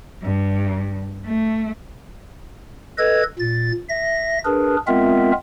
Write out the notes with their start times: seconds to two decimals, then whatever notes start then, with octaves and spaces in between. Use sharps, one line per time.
0.21 G2
1.25 A3
2.98 A4 B4 D#5 G#6
3.39 A#2 A6
3.89 E5 A#6
4.45 D4 G#4 A#4 B4
4.87 G#3 B3 C4 F4 A#4 E5